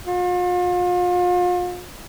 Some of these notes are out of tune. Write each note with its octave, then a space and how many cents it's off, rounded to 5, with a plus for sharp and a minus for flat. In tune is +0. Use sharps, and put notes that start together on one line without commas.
F4 +40